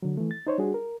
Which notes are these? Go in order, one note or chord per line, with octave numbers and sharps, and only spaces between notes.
D3 F#3
E3 A3
A6
D#4 C5 C#5
G3 D4 F#4 G#4
A#4